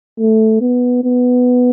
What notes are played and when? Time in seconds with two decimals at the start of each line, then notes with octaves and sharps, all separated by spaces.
0.20 A3
0.61 B3
1.04 B3